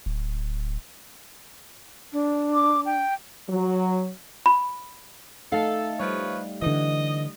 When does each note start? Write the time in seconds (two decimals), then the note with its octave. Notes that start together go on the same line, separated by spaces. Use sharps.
0.06 D1
2.13 D4
2.54 D6
2.86 G5
3.49 F#3
4.46 B5
5.52 A3 D#4 A4 F5
6.00 F3 G3 B4 C#5
6.62 D3 E3 D#5